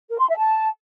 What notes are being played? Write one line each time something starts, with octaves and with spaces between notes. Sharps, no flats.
A#4
C6
E5
A5